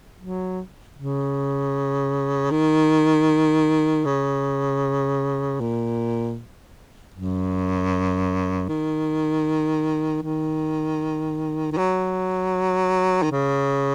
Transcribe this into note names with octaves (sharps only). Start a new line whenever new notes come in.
F#3
C#3
D#3
C#3
A#2
F#2
D#3
D#3
D#3
F#3
D#3
C#3